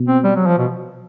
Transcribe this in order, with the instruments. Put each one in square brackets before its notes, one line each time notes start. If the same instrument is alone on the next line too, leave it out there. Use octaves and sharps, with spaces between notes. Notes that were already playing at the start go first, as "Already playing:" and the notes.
Already playing: [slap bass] B2
[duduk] C4
G3
F#3
F3
B2